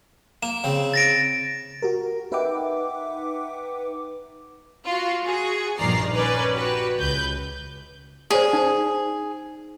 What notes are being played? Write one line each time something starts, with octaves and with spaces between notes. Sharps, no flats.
A#3 E7
C#3 C4
A6 A#6 D7
F#4 G4 A#4
D#4 B4 E5 F#5 G5 D6
F4 F#4
F#4 G#4
A#1 G2 D#3 D5 A#5 C7
C#4 A#4 B4 D5
F#4 G4 B4
C#2 B4 G6
G#4 C5 D5 D#6
D#4